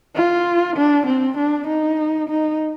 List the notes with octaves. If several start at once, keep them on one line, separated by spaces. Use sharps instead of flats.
F4
D4
C4
D4
D#4
D#4